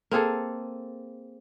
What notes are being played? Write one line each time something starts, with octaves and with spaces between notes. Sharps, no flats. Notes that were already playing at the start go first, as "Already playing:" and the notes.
A#3 C4 G#4 A4